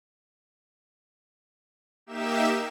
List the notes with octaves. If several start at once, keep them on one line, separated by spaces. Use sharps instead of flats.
A#3 D#4 G4 E5 E7